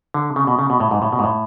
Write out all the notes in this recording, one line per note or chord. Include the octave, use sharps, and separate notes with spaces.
D3
C#3
B2
C#3
B2
A2
G#2
A2
B2
G#2
A2